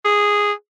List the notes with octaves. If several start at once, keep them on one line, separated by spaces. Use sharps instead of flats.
G#4